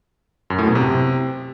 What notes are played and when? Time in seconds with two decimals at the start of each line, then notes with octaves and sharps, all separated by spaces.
0.50 F#2
0.58 A2
0.67 B2
0.75 C3